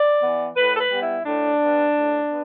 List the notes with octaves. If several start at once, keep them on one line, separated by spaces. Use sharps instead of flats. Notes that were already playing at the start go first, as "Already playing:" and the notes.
Already playing: D5
E3 B3
A2 B4
A4
B4
G3 B3
E4
A2 D4
G3 B3
A2
B3